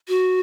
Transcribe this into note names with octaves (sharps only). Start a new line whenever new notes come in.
F#4